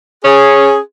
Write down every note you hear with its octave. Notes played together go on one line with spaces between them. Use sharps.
C#4 G#4